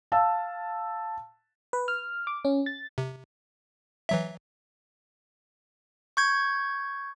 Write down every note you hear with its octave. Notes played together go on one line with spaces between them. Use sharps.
F5 A5 E6
B4
F6
D6
C#4
A6
C3
E3 F#3 E5
C#6 G6 G#6